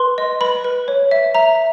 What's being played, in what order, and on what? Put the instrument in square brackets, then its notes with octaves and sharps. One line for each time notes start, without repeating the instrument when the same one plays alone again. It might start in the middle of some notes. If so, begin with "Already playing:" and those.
Already playing: [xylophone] B4 C6
D#5
B4 B5
B4
C#5
E5
E5 A#5